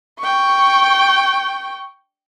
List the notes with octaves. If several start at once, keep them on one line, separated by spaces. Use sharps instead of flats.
G5 C#6